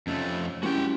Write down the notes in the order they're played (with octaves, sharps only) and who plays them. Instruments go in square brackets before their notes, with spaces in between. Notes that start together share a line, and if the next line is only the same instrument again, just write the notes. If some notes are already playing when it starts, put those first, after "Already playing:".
[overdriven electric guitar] F2 A3 [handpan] C#4 D#5
[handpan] F#3 E4 A#4 [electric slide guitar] G#3 C#4 G4 [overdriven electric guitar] F#4 G5